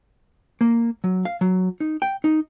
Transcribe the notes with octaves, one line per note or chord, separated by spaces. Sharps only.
A#3
F#3
F5
F#3
D#4
G5
D#4